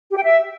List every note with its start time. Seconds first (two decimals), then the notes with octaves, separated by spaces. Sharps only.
0.11 G4
0.17 G5
0.23 E5